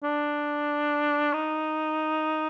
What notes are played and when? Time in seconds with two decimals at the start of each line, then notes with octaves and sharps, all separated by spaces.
0.04 D4
1.33 D#4